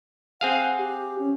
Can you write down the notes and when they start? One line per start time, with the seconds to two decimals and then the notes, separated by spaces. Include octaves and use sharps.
0.41 C4 G#4 F5 F#5
0.78 G4
1.19 C#4